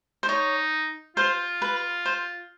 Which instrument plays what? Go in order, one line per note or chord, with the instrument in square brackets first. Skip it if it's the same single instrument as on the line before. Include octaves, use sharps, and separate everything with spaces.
[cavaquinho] C5
[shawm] D#4 [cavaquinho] C#5
[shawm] F4 [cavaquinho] C5
[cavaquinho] B4
C5